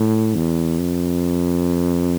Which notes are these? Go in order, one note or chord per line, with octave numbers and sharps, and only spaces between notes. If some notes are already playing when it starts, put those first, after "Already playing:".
Already playing: A2
E2
F2